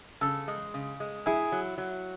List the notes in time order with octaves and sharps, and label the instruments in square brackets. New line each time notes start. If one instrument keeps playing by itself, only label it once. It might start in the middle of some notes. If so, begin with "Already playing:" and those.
[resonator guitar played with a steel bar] C#3 [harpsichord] A4
[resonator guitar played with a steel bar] G#3
C#3
G#3
[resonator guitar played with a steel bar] E4 [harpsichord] G#4
[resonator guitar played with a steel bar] F#3
F#3